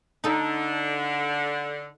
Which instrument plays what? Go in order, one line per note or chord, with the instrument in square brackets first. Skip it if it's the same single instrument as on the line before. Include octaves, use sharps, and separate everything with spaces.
[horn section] D3 [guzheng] D#4 A4